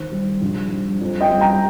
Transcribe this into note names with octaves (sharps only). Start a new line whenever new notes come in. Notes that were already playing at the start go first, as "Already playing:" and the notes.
Already playing: D#2 D#3 C5
G3
A#1
G3
F2
D#5 G5
G3
G5 A#5